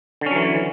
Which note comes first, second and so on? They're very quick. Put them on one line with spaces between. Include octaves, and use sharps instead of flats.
D3 C#4 F#3 E3